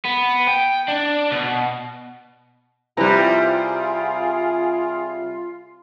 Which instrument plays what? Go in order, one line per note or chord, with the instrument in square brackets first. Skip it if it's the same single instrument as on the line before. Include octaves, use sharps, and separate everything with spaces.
[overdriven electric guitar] B3
G5
D4
B2
[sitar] C3 G3 [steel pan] E4 B4 A#5 [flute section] F4 [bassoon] G#4